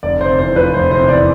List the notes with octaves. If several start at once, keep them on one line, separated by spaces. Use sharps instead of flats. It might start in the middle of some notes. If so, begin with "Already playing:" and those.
F1 D5
C3 C5
E2 C5
F3 B4
F1 C5
C3 C5
E2 D5